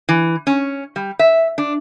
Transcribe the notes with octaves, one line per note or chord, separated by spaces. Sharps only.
E3
C#4
G3
E5
D4